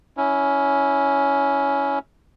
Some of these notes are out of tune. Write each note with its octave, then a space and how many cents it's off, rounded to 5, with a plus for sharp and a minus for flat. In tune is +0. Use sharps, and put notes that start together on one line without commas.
C#4 +15 E4 -15